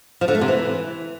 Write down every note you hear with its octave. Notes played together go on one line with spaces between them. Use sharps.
F3
D3
A3
C3
E3